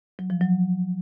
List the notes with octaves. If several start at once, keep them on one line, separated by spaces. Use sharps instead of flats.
F#3
F3
F#3